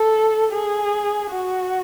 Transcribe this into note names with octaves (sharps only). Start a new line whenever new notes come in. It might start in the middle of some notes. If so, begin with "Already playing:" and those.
Already playing: A4
G#4
F#4